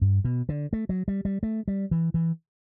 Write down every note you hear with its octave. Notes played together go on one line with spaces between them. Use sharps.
G2
B2
D3
A3
F#3
G3
G3
A3
G3
E3
E3